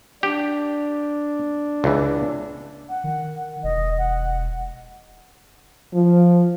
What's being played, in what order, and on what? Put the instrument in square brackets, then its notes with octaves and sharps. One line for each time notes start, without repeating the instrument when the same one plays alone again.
[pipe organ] D4 [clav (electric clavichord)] G4
[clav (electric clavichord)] C#2 E3
[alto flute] F#5
[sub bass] D#3
[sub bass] E1 [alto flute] D#5
[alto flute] F#5
[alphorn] F3